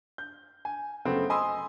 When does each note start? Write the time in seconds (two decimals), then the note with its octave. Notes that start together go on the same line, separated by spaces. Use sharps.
0.18 G6
0.65 G#5
1.05 C#3 F#3 A3 B3 C4
1.30 D#5 G#5 B5 C6 D#6 E6